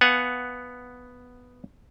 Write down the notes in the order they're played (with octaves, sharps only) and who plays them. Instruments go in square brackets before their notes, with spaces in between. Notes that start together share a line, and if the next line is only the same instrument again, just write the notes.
[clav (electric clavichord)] B3 F5 F#5 G#5